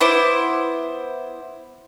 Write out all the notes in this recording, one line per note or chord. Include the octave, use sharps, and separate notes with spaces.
B3 E4 C5 D6